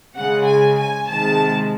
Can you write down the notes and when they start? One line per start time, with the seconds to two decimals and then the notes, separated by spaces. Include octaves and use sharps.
0.15 C#3 G#3 F#5
0.45 G#5
0.75 G#5
1.06 C3 D#3 G#3 A5